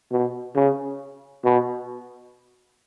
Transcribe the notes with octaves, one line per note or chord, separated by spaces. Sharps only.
B2
C#3
B2